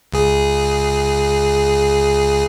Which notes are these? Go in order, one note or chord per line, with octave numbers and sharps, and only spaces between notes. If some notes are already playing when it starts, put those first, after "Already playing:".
C#2 G#4